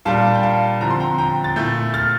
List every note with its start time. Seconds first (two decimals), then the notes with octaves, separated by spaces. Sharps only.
0.05 A#2 G3 D4 F5 A5
0.34 G5
0.43 F5 A5
0.81 D3 F3 C4 E4 A#5
0.90 C6
1.00 G5 A#5
1.18 G5 A#5
1.44 A6
1.56 A#2 A3 E4 E6 G6
1.94 F6 A6